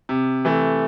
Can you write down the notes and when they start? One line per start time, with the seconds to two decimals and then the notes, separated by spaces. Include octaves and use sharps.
0.09 C3
0.45 E3 A3